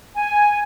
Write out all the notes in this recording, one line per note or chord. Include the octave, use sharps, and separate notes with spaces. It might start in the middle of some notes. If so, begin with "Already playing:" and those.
G#5